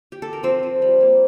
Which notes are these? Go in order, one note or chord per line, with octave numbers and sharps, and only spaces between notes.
G4
A4
A#4
F3 C4 C5
F3
G3
A#3